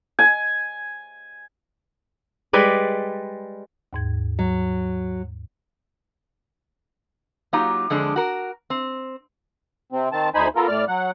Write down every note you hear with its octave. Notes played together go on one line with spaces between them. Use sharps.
G#5
G3 G#3 B4 D5
D#2 G#2 G#6
F#3
F#3 A#3 D#4 F4 G4 A#5
F2 D3 G#3 D4
F#4 A#4
C4
C3 C4
D#3 C4 A5
D2 D#4 C5 G#5 B5
B3 F4 A4 A#4
A2 D5 F6
F#3 F#5